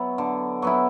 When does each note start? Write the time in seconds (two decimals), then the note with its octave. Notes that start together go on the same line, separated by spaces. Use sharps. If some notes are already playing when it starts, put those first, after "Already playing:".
Already playing: F#3 B3 E4
0.18 D3
0.62 F#3 B3 E4